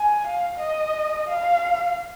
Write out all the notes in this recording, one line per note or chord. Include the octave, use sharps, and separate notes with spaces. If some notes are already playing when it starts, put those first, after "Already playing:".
Already playing: G#5
F5
D#5
F5